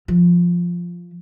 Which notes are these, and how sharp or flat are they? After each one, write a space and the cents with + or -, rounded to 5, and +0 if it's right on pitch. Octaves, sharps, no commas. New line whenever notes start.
F3 +0